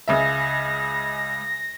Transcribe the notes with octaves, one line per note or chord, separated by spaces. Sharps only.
C#2 C#3 E5 A#6